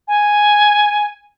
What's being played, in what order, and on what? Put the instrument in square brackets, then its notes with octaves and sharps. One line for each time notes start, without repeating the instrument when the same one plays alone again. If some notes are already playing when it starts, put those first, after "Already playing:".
[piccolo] G#5